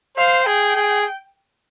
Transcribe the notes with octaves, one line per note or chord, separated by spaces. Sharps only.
C5 F5
G#4 G5
G#4